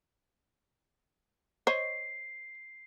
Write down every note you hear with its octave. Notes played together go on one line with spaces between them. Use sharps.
C5 C#5 D#5 C7